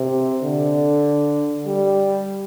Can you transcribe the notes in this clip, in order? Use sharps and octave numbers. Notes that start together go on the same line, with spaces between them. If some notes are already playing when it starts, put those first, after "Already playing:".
Already playing: C3
D3
G3